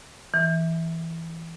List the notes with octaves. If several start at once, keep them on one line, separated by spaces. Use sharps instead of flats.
E3